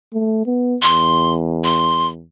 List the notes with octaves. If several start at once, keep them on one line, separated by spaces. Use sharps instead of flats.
A3
B3
E2 C6
C6